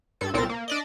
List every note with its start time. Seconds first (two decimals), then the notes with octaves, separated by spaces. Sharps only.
0.21 G2 A4 G#6
0.34 C2 A#2 C4 A4 A#4 A6
0.49 A#3
0.68 D4 D5 D#5